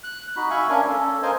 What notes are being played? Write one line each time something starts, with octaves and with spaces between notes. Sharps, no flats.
F#6
D#4 F#4 B5
E5 F5 G#5 B5 C#6
C#4 D4 A#4 F5 G#5
C#4 A4
A#4 C5 D#5 F5 G#5